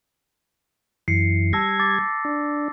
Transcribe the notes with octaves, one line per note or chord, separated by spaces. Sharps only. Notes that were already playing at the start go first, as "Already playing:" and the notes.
F#2 E3 C7 C#7
G3 A5 E6 G#6 A#6
D6 A6
D4